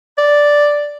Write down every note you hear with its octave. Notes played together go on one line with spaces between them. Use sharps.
D5